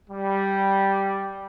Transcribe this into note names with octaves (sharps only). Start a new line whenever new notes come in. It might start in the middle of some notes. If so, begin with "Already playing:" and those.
G3